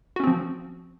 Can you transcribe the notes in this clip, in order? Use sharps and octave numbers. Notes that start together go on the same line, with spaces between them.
F3 C4 C#4 F#4